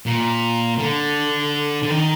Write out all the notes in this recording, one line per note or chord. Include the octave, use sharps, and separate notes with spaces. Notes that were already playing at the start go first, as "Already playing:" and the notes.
A#2
D3
D3
D#3